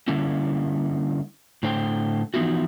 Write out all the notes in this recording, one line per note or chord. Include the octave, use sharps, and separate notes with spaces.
D3 G3 A#3 C#4 E4
A2 D3 C5 G5
E3 F3 B3 D#4 E4 F#4